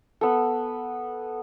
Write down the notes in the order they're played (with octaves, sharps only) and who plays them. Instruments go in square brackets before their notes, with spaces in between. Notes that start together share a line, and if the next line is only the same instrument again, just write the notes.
[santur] B3 A4